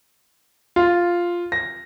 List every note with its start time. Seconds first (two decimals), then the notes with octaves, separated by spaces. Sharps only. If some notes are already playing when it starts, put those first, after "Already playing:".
0.76 F4
1.52 A#6